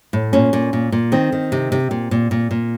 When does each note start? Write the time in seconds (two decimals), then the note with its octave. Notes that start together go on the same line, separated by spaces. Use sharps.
0.13 A2
0.33 A#2 C#4
0.53 A#2
0.73 A#2
0.92 A#2
1.12 D#3 C4
1.32 D#3
1.52 C3
1.72 C3
1.91 A#2
2.11 A#2
2.31 A#2
2.51 A#2